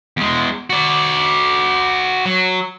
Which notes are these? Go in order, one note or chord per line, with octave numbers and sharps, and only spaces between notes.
E2 G#3
F#4 D5
F#3